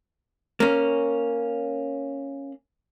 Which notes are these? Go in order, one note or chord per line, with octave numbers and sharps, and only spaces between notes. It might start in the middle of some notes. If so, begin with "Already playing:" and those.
A#3 C#4